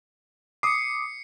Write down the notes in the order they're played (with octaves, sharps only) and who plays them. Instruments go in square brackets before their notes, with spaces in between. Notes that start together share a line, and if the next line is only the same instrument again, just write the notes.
[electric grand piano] D6 D#6 [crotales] C7 C#7